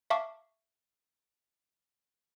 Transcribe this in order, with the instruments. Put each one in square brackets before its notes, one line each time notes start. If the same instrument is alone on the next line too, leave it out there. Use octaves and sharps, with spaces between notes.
[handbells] E5 F5 A5 C#6 D6